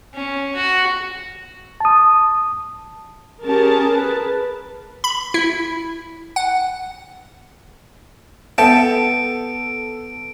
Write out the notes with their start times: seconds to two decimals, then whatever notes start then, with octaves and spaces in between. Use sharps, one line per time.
0.15 C#4
0.55 F#4
1.80 A5 D#6
3.45 C#4 G4 G#4 A#4 A5
3.92 B4
5.04 B5
5.34 E4
6.36 F#5
8.58 B3 A4 E5 G5 A5 D7